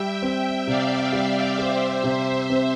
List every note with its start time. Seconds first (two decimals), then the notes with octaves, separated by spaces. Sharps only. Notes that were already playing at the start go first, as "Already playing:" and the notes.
Already playing: G3 E5 G5
0.22 C4 E5 G5
0.67 C3 D5 F5
1.12 G3 D5 F5
1.58 G4 C5 E5
2.04 C3
2.50 C4